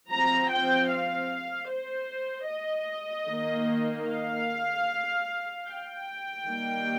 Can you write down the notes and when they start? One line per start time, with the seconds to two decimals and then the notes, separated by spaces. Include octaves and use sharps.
0.11 F3 C4 A#5
0.51 G5
0.91 F5
1.70 C5
2.50 D#5
3.30 D#3 A#3
4.09 F5
5.68 G5
6.47 D#3 G3 A#3